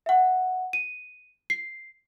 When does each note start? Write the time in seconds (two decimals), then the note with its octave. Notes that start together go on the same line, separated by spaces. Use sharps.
0.06 E5 F#5
0.73 D#7
1.50 C7